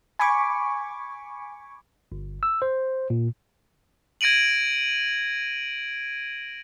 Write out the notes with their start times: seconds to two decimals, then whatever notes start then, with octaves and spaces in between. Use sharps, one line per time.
0.19 G#5 B5 C#6 D6
2.12 G1
2.43 E6
2.62 C5
3.10 A#2
4.21 G#6 A#6 D7 D#7 F#7